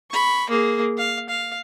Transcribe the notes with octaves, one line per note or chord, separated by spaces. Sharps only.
B5 C#6
A#3 G#4
F5
F5